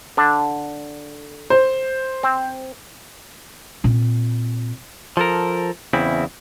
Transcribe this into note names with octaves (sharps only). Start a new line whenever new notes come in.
D3 D4
C5
C4
A#2 C4
F3 A4 A#4
E2 C#3 C4 E4